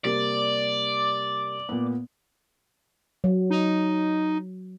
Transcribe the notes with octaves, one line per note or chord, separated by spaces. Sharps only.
C3 G3 A#3 D5
A#2 B3
F#3
D#4